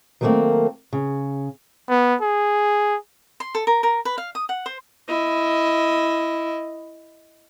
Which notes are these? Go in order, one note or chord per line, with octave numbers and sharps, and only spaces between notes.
D#3 F#3 G3 A3 A#3 C4
C#3
B3
G#4
C6
A4
A#4
A#4
B4
F5
D#6
F#5
C5
E4 D#5